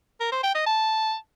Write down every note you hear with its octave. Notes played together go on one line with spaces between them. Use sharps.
A#4
C5
G5
D#5
A5